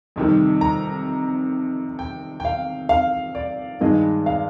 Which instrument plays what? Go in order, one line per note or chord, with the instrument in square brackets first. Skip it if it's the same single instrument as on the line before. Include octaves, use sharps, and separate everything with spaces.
[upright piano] F2 C3 D#3 G3
A#5
G5
G5
F5
F5
D5
G2 D#3 G#3 D#5
F5